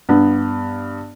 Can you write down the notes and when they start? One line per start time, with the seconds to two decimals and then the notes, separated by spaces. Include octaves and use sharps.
0.09 G2 B3